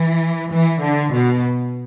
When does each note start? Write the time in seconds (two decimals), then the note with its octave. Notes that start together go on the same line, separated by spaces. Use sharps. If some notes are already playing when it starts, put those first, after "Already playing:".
Already playing: E3
0.51 E3
0.82 D3
1.13 B2